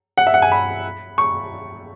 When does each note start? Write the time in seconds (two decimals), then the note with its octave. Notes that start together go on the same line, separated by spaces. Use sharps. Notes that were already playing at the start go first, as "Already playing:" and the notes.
0.17 F#5
0.27 E5
0.34 F#5
0.42 G#5
0.52 B5
1.18 C#6